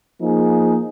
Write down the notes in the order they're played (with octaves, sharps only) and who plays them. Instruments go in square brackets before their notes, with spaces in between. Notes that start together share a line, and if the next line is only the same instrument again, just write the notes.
[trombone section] F3 A#3 D#4 G#4